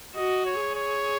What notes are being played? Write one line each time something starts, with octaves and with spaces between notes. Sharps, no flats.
F#4 D#5
C#5
G#4
C#5